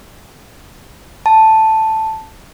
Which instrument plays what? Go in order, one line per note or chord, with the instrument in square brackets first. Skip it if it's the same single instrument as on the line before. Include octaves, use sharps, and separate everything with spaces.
[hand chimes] A5